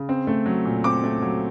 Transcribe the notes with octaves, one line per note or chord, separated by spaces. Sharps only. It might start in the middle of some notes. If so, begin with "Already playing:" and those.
Already playing: C#3
C4
A3
F#3
A#2
C4 D6
A3
F#3